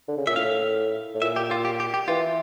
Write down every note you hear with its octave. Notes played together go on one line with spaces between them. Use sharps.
D3
C#3
A#2 E5
A2 F5
A2
A#2 E5
G4
F4
G4
G4
G4
E3 F4